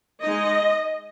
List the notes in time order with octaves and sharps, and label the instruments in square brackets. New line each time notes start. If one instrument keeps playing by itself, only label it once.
[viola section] G#3 D#4 D#5